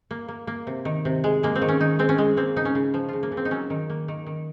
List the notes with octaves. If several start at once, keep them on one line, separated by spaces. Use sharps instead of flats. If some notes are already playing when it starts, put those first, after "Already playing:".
A#3
A#3
A#3
C3
D#3
C3
G#3
G#3 A#3
C4
D#3
C#4
D#3 D#4
G#3 C4
C#4
G#3
A#3 C4
C#3 D#4
C#4
C#3
F3
C#3 F4
A#3
C#3
C4
D#4
F#3 C#4
D#3
A#3
D#3
D#3